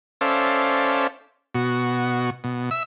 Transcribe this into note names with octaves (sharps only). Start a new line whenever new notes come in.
C#4 A4 C5 D5 E5 F5
B2 F#4
B2
E5 E6